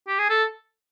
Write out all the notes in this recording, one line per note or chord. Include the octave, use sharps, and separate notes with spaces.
G4
G#4
A4